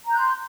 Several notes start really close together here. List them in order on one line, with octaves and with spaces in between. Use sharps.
A#5 G6 F#6 C6